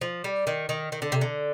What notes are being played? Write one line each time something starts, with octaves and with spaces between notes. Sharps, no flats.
F3
G3
D#3
D#3
D#3
D3
C3
D3